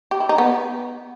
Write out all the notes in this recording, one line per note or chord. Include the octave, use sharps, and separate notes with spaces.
G4
E4
D#4
B3